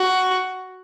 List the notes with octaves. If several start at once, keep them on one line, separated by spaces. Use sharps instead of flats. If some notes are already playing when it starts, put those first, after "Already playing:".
Already playing: F#4